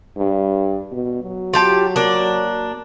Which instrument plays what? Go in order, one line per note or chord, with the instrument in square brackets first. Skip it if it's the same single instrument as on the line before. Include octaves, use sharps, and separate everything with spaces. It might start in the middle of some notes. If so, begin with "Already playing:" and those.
[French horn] G2
B2
F#3
[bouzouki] F4 G4 A5
A#3 D4